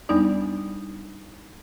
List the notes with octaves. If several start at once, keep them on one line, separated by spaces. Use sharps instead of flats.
E2 G3 B3 D4 D#4 D5